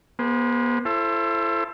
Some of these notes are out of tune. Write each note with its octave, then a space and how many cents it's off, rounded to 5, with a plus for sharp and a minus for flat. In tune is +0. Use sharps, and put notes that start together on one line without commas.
B3 -40 G#4 +0 C5 -10
E4 +35 A4 +0 C5 +25